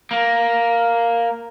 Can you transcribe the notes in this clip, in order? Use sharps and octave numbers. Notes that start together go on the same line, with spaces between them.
A#3